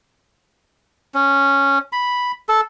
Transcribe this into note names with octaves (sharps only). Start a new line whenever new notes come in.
C#4
B5
A4